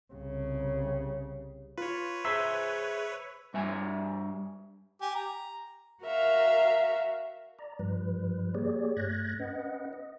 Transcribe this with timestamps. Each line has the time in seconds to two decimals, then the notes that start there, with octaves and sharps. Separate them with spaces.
0.13 C2 C#3
1.78 F4 B4 C#5
2.25 G#4 C5 E5 A#5 E6 B6
3.54 G2 E5 G#5
5.01 G4 G#5
5.15 A#5
6.03 F#4 A#4 E5 F5
7.59 D5 A#5
7.79 G2 F3 G3 B4
8.55 A#3 G4 G#4 C#5 D5
8.97 G2 A3 F#6 G#6 A#6
9.39 C#4 B4 D#5 F#5
9.93 D#5